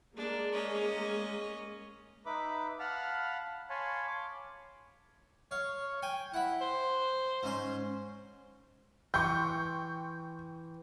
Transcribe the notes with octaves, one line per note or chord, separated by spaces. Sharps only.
G#3 A#3 D4
C#4 D#5
D#4 B4 E5 B5 D6
F5 F#5 A5 B5 F6
C#5 F5 G#5 A5 B5 C6
C6 D6
C#5 F5
G5 G#5
E4 F#5 B5
C5
G#2 C#4 C6
E3 G5 C6 C#6 G6